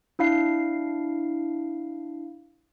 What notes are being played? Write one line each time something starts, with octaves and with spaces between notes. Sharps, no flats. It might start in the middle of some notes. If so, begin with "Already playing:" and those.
D4 E4 F5 C7